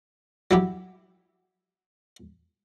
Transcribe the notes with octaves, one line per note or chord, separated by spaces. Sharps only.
F#3 E4 G4